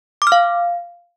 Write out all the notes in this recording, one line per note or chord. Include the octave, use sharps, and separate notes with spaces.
D6
F6
F5